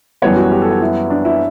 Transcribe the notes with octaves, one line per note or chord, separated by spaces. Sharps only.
F#2 E3 G3 B3 C#5
F#4
G4
A4
G4
E4
D4
E4